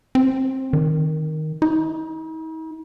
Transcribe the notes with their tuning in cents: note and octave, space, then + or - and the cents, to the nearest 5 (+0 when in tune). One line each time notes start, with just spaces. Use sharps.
C4 +20
D#3 +0
D#4 +45